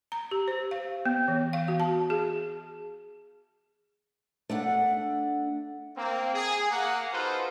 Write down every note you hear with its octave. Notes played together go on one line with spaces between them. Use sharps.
A#5
G4
C5
F5
B3
E3
F5
F#4
A5
G#4
A3 D4 F#5
A#3 C4
G#4
A#3 F#5
D#4 F4 F#4 A4 B4 C5